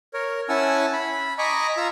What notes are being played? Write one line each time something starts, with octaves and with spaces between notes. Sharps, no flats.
A#4 C#5
C#4 E4 F#5 G#5 A5 E6
B5
D#5 G#5 A#5 B5 C#6 D6
F4 A#5 E6